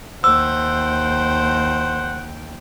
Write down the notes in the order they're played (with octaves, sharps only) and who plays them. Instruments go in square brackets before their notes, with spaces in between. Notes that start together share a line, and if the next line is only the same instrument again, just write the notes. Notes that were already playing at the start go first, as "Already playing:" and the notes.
[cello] D#2 G5 [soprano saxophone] C5 [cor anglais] F#5 [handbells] E6